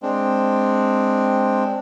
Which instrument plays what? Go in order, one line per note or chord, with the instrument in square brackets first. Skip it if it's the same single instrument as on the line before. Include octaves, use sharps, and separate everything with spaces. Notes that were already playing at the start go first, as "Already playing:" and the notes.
[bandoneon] G#3 C4 D4